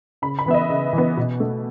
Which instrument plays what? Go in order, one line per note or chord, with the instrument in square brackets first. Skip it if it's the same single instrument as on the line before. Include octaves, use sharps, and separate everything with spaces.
[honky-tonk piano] C#3 B5
B5
E3 B3 E5
D#5
C#3
E3 B3
B2
A3